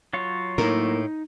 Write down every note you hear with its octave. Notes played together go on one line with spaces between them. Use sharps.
F#3 F4 C#5
A2 A#3 D#4 E4 A#4